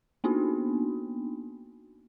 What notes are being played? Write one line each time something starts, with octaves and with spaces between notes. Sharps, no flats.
A#3 B3 D4 D#4 F#4